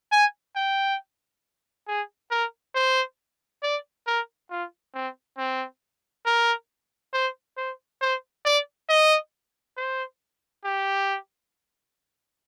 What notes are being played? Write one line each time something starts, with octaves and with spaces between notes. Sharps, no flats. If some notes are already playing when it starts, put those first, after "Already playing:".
G#5
G5
G#4
A#4
C5
D5
A#4
F4
C4
C4
A#4
C5
C5
C5
D5
D#5
C5
G4